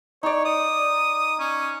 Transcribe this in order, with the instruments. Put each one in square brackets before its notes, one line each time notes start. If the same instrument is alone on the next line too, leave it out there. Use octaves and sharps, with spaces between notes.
[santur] D#4 D5 [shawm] C#5
[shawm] D#6
C#4